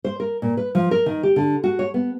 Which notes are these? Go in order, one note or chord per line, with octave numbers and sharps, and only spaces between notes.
C5
A#4
A#2
B4
F3
A#4
D#3
G4
D3
F#4
C#5
B3